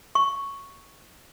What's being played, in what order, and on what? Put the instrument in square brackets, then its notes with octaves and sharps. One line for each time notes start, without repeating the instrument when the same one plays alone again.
[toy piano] C#6